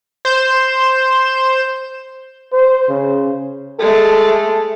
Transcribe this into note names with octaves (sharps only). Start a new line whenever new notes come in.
C5 G6 E7
C5
C#3
G#3 A3 A4